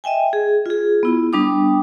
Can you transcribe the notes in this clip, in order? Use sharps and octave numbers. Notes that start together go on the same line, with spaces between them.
D#5 E5 G5 G#5
G#4
F4 G#4
B3 E4
G3 B3 D4 G5 D6 D#6